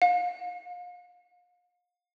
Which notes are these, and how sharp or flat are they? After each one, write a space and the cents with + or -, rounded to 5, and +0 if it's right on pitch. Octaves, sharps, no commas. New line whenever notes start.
F5 +35